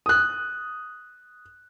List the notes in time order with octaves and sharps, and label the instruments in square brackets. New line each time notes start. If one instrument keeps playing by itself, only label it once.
[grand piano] D#6 F#6